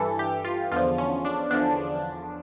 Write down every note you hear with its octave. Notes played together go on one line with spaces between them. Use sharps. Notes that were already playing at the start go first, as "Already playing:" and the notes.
Already playing: G2 E3 A4
G4
F4
E2 D3 F3 F4
C#4
D4
E2 D3 F3 D4